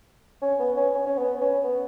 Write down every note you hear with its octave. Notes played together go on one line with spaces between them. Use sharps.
C#4
B3
C#4
C#4
C#4
B3
C#4
B3